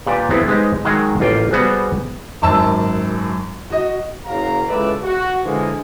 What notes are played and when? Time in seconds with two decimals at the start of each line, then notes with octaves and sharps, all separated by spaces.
0.07 A#2 G4 B4 D5 G5 A5
0.30 B3 C4 E4 G4 A4
0.48 G#3 D#4 G4 B4 C5 D#5
0.85 D#3 F#3 G#3 F#4 G#4 A#4
1.20 A1 A#3 F4 F5 G5
1.51 G3 B3 F#4 G#4 C5 F#5
2.42 G#1 F#2 A5 E6
3.70 F#4 D#5
4.26 F#1 F#3 A#4 F5 A#5
4.68 C#2 A2 G#3 B4 D5 E5
5.02 F#4
5.43 D3 E3 F3 G#3 A#3